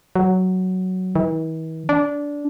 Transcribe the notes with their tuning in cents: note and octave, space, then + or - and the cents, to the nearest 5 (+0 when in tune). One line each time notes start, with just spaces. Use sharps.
F#3 +5
E3 -45
D4 -15